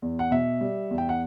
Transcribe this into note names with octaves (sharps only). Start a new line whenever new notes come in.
E2
F#5
B2 E5
G3
E2
G5
F#5